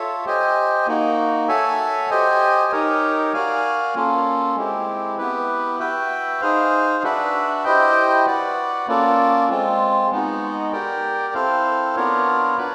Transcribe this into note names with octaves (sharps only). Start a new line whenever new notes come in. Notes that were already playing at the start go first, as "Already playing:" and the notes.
Already playing: F4 A4 C#5 E5
G4 C5 D#5 G#5
A#3 D#4 F#4
F#4 A4 C#5 E5 G#5
G4 C5 D#5 G#5
D#4 G4 A#4 C#5
F#4 A#4 D5 F5 G#5
A#3 C#4 F4 A4
G#3 C4 E4 G4
B3 E4 G4 B4
F#4 B4 E5 G5
D#4 G#4 C5 F5
D4 F#4 B4 E5
E4 G4 C5 D#5 G5
F#4 B4 D5 F#5
A#3 C#4 F4 A4 D5
G#3 C4 F4
G#3 B3 D#4 F#4
G4 A#4 D5 G5
C4 E4 A4 C5 F5
B3 D4 F4 A#4 C#5
D4 F#4 B4 D5